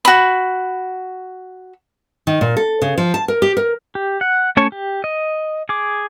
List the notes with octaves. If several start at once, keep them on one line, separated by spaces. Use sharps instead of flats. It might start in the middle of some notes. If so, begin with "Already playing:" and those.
F#4 B5
D#3
A#2
A4
C#3
F3
A5
A#4
G4
A#4
G4
F#5
A3 C#4 C#5 A5 C#6
G4
D#5
G#4 D6